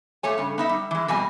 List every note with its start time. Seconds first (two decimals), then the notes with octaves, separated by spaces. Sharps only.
0.23 A#2 A3 C#5 G#5
0.38 G2 C#3
0.58 B3 D#4 E5
0.69 G3
0.91 E3 G#3
1.08 F2 B2 G3 D#5 G#5